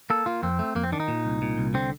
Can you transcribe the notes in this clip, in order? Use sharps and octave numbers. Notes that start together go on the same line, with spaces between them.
A#3 A4
A#3 F4
F2 C4
A3
F2 A#3
C4
D#3 D4
D#4
A#2
C2
A#2
C2
D3 C4